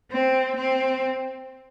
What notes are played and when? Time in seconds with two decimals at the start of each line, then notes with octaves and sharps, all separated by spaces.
0.11 C4
0.56 C4